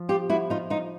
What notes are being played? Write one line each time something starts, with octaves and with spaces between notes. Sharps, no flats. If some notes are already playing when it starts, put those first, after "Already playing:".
Already playing: F3
F4 G4
E4 F#4
D#4 F4
D#4 F4